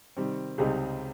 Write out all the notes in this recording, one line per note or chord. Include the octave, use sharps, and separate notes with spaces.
C3 D#3 G3 C4
C#2 C3 G3 C4 D#4 G#4